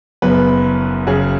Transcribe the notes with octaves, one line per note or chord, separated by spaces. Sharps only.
F#1 F#2 F#3 B3 B4
F#1 F#2 C#3 F#3 G#4